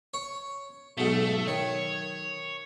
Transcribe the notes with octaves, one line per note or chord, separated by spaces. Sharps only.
C#5
B1 G#2 A3
D#3 C#5